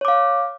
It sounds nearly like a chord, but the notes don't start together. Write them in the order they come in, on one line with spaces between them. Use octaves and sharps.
C#5 D6 F5